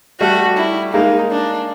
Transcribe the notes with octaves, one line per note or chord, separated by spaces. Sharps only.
G3 A3 F#4
E4
G#3 A#3 D#4
D4